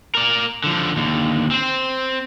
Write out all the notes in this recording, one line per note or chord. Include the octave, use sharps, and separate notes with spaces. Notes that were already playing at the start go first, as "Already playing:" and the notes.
A#4 D5
D3 F3
D#2 D3
C4 C5